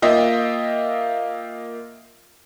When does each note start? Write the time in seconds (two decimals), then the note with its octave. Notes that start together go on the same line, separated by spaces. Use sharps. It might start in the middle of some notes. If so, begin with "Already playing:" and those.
0.02 A#3 F4 D#5 E5 G5